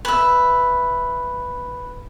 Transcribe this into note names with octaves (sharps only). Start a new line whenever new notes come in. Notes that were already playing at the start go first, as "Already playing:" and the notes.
B4 E5